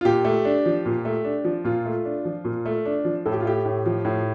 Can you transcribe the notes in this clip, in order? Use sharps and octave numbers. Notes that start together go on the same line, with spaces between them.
F4
A#2 G4
A3
D4
F3
A#2
A3
D4
F3
A#2 F4
A3
D4
F3
A#2
A3
D4
F3
A2 A4
G4
F4
A3 G4
A2
F3
A2